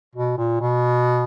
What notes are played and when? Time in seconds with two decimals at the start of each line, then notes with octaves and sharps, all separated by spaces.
0.15 B2
0.38 A#2
0.61 B2